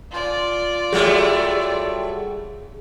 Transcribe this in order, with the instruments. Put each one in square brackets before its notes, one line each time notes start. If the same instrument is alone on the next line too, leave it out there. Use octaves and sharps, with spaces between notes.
[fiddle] F4 D5
[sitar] F#3 G3 A3 [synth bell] G#4